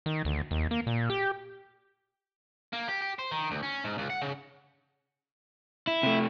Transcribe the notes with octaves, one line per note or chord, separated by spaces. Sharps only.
D#3
D2
D#2
A#3
A#2
G4
A#3
G4
G4
C5
D#3
D2
C#4
G#2
C#2
F#5
C#3
E4
C3 A3